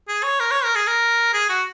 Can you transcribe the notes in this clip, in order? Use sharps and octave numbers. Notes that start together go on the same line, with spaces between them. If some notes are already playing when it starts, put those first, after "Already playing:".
G#4
C#5
A#4
C#5
A#4
G#4
A#4
G#4
F#4